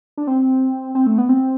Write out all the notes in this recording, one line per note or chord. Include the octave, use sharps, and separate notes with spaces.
D4
C4
C4
A3
B3
C4